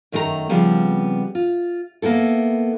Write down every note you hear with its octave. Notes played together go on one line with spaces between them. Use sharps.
F#2 D#3 A3 G4 A#5
C#3 F3 G3 B3 C4
F4
A#3 B3 E4 A4